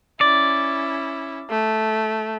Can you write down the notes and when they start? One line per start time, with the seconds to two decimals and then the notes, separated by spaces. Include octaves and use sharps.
0.21 C#4 E4 D5
1.50 A3